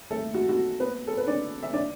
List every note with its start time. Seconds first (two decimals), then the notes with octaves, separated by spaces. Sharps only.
0.10 A3 A4
0.34 F#4
0.49 F#4
0.80 B3 B4
1.07 A4
1.17 B4
1.27 D4 D5
1.63 E5
1.73 D4 D5